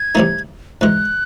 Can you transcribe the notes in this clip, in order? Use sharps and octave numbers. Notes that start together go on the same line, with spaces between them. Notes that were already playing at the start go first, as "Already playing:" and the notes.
Already playing: G#6
C2 C3 E3 A3 D#4
G#2 E3 G#3 F#6